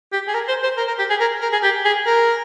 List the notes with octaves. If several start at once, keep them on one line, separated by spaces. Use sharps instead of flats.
G4
G#4
A#4
C5
C5
A#4
A#4
G4
G#4
A#4
A#4
G#4
G4
G#4
A#4